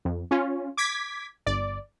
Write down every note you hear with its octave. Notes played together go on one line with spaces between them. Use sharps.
F2
C#4 F4
D6 G#6 B6
G1 D5